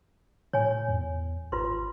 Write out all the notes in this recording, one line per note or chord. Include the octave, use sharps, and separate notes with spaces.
A2 C#5 G#5
E2
G#1 F4 B4 C6